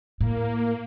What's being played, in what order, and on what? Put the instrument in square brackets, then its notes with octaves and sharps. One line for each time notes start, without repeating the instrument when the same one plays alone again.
[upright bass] A2 [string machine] A#3